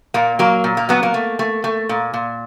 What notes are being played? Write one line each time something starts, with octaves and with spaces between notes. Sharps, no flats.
A#2 A#3
F#3 A#3
A#2
A#3
F#3 B3
A#3
A3
A3
A3
A#2
A#2